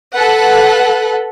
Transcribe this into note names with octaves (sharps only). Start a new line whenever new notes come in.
A4 B4 F#5